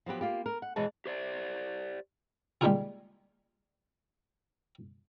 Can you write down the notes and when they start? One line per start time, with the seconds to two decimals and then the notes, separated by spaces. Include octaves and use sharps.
0.06 F3 F#3 B3 G4
0.21 A#3 F4 G4
0.46 A#4
0.62 F#5
0.76 E2 B2 E3 G#3 C#5 A5
1.06 G4 C5 D5
2.61 G3 G#3 A#3 D#4 F4 G#4